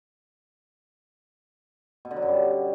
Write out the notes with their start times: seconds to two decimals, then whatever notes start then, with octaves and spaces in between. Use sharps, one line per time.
2.05 B2
2.11 D3
2.16 F#3
2.22 F#2
2.28 G3